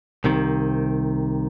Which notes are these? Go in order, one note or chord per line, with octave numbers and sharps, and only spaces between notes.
C2 C3 D#3